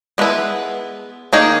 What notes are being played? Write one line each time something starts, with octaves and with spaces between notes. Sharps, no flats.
G#3 B3 E4 B4
D#3 A#3 D#4 G#4 C#5